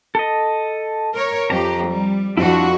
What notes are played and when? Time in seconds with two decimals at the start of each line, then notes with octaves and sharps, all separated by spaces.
0.15 A4 D#5
1.15 A#4 C#5
1.50 F2 G4 A#5
1.86 G3
2.37 F2 D4 E4 F#4